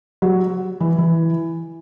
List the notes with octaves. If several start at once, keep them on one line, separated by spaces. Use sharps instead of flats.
F#3
E3
E3